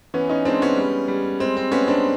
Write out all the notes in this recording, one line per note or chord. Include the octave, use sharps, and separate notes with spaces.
E3 B3 C#4
C#4 D#4
G#3 C4 D4
B3 C#4
G3
G3
G#3 C4
C4
G#3 B3 C#4
C4 D4